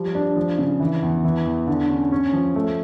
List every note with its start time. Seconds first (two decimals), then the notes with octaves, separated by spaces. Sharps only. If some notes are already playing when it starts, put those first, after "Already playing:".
Already playing: F3 G3
0.15 D4
0.37 F3
0.59 C#3
0.80 E3
1.03 E2
1.25 E3
1.45 E2
1.68 D3
1.89 C#4
2.12 C#4
2.33 F3
2.56 A3